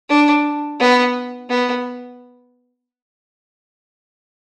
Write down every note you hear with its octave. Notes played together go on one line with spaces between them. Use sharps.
D4
B3
B3